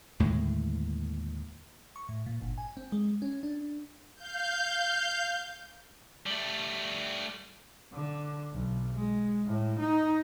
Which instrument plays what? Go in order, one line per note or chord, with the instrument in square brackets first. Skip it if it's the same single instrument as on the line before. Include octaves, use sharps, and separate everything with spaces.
[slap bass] D#2 A2 D3 G#3
[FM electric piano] C#6
A2
A#2
G1
G#5
C4
G#3
C#4
D4
[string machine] F5 G6
[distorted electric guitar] G3 A3
[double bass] D3
B1
G#3
A2
D#4